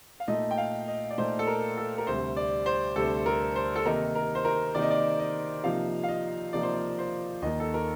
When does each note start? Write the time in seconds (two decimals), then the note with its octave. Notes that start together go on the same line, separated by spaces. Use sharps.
0.20 F5
0.28 A#2 A3 D#4 D#5
0.51 G5
0.58 F5
0.88 D#5
1.10 D5
1.17 A#2 A3 D#4 C5
1.39 A4
1.47 A#4
1.77 A4
1.98 A#4
2.07 D2 C3 G3 C5
2.37 D5
2.66 C5
2.96 D2 C3 G3 A4
3.26 A#4
3.56 C5
3.76 A4
3.85 C3 D#3 A#3 D#4 A#4
4.15 A#4
4.35 C5
4.45 A#4
4.75 C3 D#3 A#3 D#4 D5
4.82 D#5
4.91 D5
5.19 D#5
5.63 C3 F3 A#3 D#4 F5
6.03 F5
6.08 D#5
6.53 C3 F3 A#3 D#4 D5
6.63 C5
6.74 D5
6.98 C5
7.42 D#2 D#3 A#3 D#4 D#5
7.60 A4
7.74 A#4